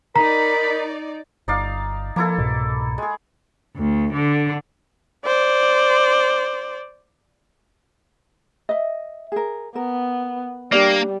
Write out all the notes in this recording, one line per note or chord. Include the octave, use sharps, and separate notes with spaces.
D#4 A#4 D5 A#5 B5
G1 D#4 D5 F5
F3 A#3 E4 A4
C2 G#2 B2
G#3 G#4
D2
D3
C5 D5
D#5 E5
G#4 A#4
B3 A#4
G3 A#3 D4 G4 D5